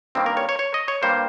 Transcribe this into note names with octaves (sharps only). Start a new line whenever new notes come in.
G2 D#3 G3 A#3 C4
A#4
C#5
C#5
C#5
D#5
C#5
G2 G3 A#3 C5